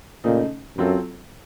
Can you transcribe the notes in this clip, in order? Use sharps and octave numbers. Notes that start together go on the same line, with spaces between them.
A#2 C#3 A3 D#4
F#2 F#3 C4 F4 A4